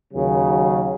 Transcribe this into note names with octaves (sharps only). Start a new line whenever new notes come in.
D#2 C#3 F#3